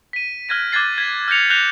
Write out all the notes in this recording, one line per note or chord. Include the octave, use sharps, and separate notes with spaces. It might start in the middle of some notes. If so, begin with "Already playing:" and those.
B6 D#7
F6 F#6 G#6 A#6 D#7
D6 F#6 G#6 A6 C7
G#6 B6
F6 G6 A#6 C#7 F7
F#6 G6 A#6 C7 E7 F7